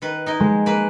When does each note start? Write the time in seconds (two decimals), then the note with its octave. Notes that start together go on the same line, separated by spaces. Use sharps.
0.02 D#3 B4
0.26 D#4 E4 D#5
0.40 G#3
0.66 A#3 B4